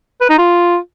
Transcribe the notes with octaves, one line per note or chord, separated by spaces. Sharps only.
B4
D#4
F4